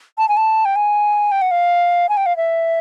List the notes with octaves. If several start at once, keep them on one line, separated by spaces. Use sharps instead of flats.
A5
G#5
A5
G5
G#5
G5
F#5
F5
G#5
G5
F5
E5